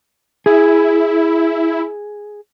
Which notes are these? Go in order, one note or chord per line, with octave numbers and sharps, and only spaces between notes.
E4 G#4